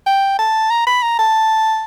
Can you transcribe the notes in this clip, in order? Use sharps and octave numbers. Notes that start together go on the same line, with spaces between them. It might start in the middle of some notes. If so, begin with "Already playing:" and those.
G5
A5
A#5
B5
A#5
A5